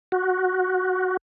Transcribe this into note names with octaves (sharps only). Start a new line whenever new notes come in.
F#4